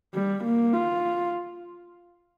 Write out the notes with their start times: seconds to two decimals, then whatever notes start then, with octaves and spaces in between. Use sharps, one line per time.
0.14 G3
0.44 A#3
0.73 F4